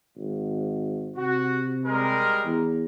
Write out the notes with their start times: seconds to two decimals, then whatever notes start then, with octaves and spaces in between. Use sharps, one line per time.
0.16 G#1
1.17 C3 F#4
1.86 G3 G#3 A#4
2.45 E2